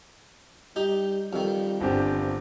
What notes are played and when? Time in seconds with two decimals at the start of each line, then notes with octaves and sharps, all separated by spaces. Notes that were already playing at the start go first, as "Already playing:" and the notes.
0.76 G3 D#4 G4
1.33 F2 D#3 G3
1.81 G1 C4 D4 G4